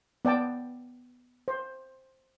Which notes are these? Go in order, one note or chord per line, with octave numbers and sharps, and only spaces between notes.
B3 D5 G5 A5
C5